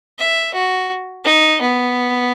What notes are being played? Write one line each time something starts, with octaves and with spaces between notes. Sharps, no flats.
E5
F#4
D#4
B3